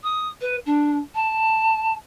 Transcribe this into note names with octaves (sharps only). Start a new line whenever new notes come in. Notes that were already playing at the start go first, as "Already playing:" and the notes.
D#6
B4
D4
A5